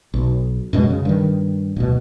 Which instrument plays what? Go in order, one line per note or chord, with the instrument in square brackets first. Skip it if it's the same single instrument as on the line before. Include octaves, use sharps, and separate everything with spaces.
[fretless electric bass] B1
F#2 B2 G#3
C#3
G2 D#3
D1 B2